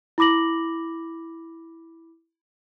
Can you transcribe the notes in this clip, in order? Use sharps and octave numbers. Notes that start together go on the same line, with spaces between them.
E4 B5 D6 A#6 F#7